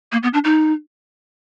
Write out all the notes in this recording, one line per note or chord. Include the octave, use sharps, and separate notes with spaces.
A#3
B3
D4
D#4